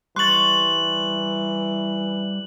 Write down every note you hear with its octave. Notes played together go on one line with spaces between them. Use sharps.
E3 G3 C6 C#6 F#6 A6 F#7